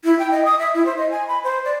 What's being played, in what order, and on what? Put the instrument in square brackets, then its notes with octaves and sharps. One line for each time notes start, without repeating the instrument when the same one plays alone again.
[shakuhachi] E4
G5
D#5
D#6
E5
E4
C5
D#5
G#5
B5
C5
D5